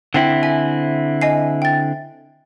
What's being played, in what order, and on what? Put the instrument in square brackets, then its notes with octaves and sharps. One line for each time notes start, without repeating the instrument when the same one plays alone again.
[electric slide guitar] D3 C4 E4 [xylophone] G5
[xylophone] E5 G#5
D#5 G#5 C7
G5 A6